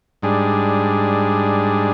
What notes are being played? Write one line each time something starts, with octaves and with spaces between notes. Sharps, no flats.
G#2 G3 D4 G#4